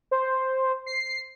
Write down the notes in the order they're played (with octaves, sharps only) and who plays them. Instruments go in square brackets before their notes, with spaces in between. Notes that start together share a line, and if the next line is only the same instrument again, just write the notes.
[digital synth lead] C5
C7